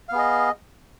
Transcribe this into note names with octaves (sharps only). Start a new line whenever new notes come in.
B3 G#4 D#5 F5